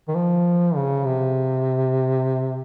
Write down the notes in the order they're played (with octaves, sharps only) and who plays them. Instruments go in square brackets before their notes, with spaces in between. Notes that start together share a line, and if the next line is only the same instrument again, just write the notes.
[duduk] D#3
F3
C#3
C3